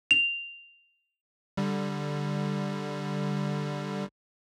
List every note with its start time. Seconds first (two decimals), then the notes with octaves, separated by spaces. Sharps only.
0.11 F7
1.57 D3 G3